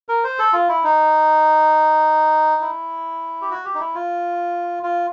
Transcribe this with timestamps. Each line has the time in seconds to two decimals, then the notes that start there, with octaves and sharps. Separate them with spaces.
0.09 A#4
0.24 C5
0.39 A4
0.53 F4
0.68 E4
0.84 D#4
2.61 E4
3.41 G4
3.51 F#4
3.65 G4
3.75 D#4
3.80 E4
3.95 F4
4.83 F4